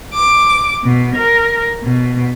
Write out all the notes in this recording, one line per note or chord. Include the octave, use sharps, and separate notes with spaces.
D6
B2
A#4
B2